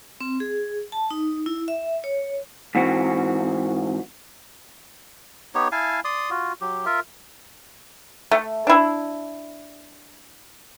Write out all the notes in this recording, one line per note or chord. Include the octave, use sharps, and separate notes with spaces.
C4
G#4
A5
D#4
E4
E5
C#5
G#2 E3 C4 F#4
B3 D#4 G4 C#5
E4 F5 G#5 A5
D5 C6 D#6
F4 F#4
F#3 G4
F4 A#4 E5
A3
D4 E4